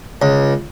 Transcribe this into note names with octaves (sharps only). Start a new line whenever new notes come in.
C#2